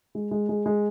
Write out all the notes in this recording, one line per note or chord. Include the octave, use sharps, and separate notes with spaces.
G#3
G#3
G#3
G#3